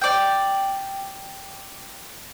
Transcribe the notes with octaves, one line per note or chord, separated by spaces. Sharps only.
D5 G5